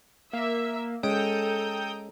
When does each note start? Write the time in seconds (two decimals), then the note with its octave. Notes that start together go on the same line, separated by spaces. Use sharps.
0.33 A#3 E5
1.03 G#3 C#4 A4 G5 A#5 D#6 G6